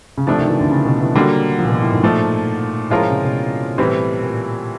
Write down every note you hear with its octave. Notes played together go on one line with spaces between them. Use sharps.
C#3
C3 F3 A3 D4
D#3
E3
D3
C#3
B2
E3
D3 F#3 G3 A#3
F3
A#2
B2
A2
G#2
A#2 F3 A3
A2 F3 G#3 C#4 F4 A#4
A#2
C#3
C3
B2
A2 E3 G3 C4
A#2